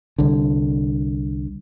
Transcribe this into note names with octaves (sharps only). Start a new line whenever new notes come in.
C2 D3